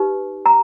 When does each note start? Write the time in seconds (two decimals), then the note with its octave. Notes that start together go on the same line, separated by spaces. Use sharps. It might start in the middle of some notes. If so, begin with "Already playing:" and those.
Already playing: D#4 G4 B4
0.46 A#5